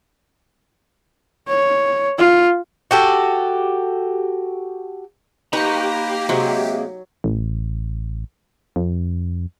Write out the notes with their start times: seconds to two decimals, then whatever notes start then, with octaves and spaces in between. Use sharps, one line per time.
1.48 C#5
2.19 F4
2.91 F#4 G4 A4
5.53 A#3 D#4 G4 B4 C5 D#5 A#5 C#6
6.29 C3 F#3 G#3
7.24 A1
8.76 F2